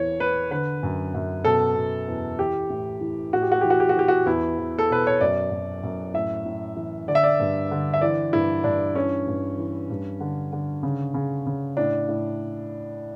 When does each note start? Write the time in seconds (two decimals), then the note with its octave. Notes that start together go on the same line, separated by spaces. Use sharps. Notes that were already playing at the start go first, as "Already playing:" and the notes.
Already playing: E2 E3 C#5
0.20 E3 B4
0.51 D3 B4
0.83 F#2
1.14 F#2
1.45 B2 A4
1.76 B2
2.08 E2
2.39 E3 G4
2.70 A2
3.01 E3
3.33 A2 F#4
3.42 G4
3.52 F#4
3.61 E3 G4
3.70 F#4
3.80 G4
3.89 F#4
3.96 E3 G4
4.08 F#4
4.26 E2 E4
4.58 E2
4.78 A4
4.90 B2 B4
5.07 C#5
5.21 F#2 D5
5.51 F#2
5.83 F#2
6.14 A2 E5
6.46 A2
6.76 E3
7.08 D3 D5
7.15 E5
7.23 D5
7.40 G2
7.71 D3
7.94 E5
8.01 E3 D5
8.33 G2 E4
8.64 G2 D4
8.95 E3 C#4
9.27 G2
9.58 E3
9.90 G2
10.20 D3
10.53 D3
10.83 C#3
11.14 C#3
11.46 C#3
11.77 A2 D4
12.08 A2